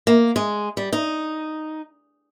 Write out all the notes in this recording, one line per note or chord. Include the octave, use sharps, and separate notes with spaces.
A#3
G#3
G3
D#4